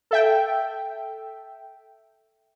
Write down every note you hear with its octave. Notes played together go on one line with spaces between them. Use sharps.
A4 E5 G5